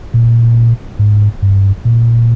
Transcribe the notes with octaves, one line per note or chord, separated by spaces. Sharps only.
A#2
G#2
G2
A#2